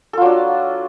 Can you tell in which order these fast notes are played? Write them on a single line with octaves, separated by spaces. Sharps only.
A4 F4 F#3 D4